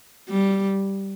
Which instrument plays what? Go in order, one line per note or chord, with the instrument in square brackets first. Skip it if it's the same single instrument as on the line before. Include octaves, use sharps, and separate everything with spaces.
[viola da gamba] G3